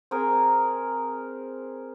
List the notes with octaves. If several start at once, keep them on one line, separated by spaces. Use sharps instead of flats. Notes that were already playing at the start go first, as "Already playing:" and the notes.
C4 G#4 A#4